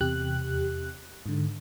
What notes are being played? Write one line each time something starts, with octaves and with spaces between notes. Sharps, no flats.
E2 C3 G4 F#6
G#2 D3